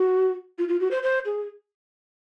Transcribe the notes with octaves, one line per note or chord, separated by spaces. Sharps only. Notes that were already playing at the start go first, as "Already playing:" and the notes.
Already playing: F#4
F4
F4
F#4
C5
C5
G#4